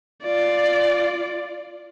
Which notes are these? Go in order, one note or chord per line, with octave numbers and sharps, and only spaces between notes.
F4 D5